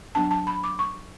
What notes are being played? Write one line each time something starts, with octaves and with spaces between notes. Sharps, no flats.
F#3 B3 D4 A5
A5
B5
D6
C#6